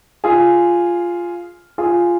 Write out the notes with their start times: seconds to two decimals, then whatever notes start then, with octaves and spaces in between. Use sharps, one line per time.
0.24 F4 G#4
1.78 F4 G#4